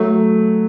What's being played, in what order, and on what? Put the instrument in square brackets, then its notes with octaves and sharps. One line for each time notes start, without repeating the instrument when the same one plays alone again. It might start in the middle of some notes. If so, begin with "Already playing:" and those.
Already playing: [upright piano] F#3 A3